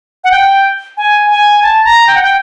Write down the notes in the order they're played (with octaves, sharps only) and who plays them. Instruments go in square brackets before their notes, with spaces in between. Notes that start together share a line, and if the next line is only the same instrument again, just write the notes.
[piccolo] F#5
G5
G#5
G#5
A5
A#5
G5
F#5
G5